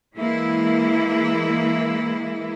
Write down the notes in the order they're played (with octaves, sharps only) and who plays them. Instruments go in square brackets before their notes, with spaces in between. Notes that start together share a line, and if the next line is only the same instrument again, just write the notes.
[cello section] E3 G#3 A#3 E4